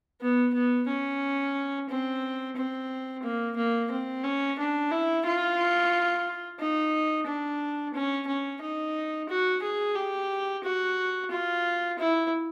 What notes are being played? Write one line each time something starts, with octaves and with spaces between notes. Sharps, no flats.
B3
B3
C#4
C4
C4
A#3
A#3
C4
C#4
D4
E4
F4
D#4
D4
C#4
C#4
D#4
F#4
G#4
G4
F#4
F4
E4